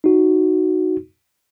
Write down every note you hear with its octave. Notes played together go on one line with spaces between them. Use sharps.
D#4 F#4